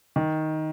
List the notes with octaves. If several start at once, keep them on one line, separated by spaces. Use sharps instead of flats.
D#3